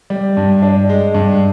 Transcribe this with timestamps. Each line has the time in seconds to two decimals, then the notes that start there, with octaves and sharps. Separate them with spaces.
0.10 G3
0.37 G2
0.63 D4
0.89 G#3
1.14 G2